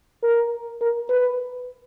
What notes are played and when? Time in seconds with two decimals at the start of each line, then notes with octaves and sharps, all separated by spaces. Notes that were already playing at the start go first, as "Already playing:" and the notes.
0.23 A#4
0.81 A#4
1.10 B4